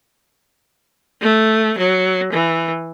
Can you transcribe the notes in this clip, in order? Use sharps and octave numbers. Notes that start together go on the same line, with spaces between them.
A3
F#3
E3